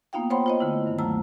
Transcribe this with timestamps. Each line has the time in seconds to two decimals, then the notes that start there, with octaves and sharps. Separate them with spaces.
0.13 A#3 B3 D#4 F4 F5 G5
0.30 C5 C#5 F#5 G5 B5 C6
0.46 F4 C#5 D#5
0.60 D3 A3 E4
0.86 G2 D#3
0.99 D2 F#3 A3 A#5 E6